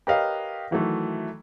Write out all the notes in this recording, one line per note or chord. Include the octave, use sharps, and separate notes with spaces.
G4 A#4 B4 C#5 D#5 F5
D#3 E3 F#3 A3